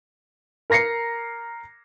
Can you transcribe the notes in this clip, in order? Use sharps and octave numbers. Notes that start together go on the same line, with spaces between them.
A#4 A#5 A#6 C7 C#7